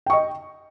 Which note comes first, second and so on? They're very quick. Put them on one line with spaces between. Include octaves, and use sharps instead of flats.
G5 C#6 D#5